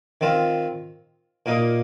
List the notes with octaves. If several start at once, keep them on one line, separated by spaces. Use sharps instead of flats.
D#3 C4 F4
A#2 A#3 D#4